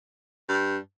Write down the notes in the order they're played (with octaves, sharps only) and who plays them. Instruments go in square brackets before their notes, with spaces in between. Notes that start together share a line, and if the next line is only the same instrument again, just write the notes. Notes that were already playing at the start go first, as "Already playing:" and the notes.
[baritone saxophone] G2